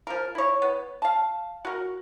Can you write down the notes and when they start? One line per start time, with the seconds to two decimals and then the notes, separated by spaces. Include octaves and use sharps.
0.07 F3 A#4
0.35 E4 C#5
0.62 B3
1.02 F5 A5
1.65 F#4 A#4